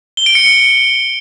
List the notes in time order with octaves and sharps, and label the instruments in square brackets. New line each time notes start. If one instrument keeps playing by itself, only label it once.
[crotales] G7
D7
C#7